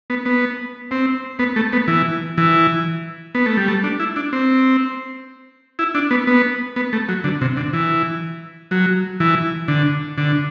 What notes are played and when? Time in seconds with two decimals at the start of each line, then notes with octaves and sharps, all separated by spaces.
0.10 B3
0.26 B3
0.91 C4
1.39 B3
1.56 A3
1.73 B3
1.88 E3
2.38 E3
3.35 B3
3.46 A3
3.57 G3
3.68 A3
3.84 D4
4.00 E4
4.16 D4
4.33 C4
5.79 E4
5.95 D4
6.11 B3
6.27 B3
6.76 B3
6.93 A3
7.09 F#3
7.24 D3
7.41 C3
7.57 D3
7.73 E3
8.71 F#3
9.20 E3
9.68 D3
10.18 D3